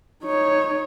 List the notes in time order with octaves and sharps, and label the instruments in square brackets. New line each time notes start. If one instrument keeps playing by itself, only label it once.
[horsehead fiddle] D#4 C#5